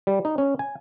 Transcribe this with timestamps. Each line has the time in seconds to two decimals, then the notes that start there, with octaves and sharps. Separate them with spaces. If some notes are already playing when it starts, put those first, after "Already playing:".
0.07 G3
0.25 D#4
0.38 C#4
0.59 G#5